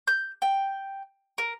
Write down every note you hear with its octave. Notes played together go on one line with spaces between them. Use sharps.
G6
G5
A#4